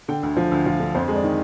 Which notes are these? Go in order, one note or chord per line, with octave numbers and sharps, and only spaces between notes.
D3 G5
D2
F3
D2
F3
D3
F2 C5
G#3
D5
D#3